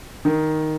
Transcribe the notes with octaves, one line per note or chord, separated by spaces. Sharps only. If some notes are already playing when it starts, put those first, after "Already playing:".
D#3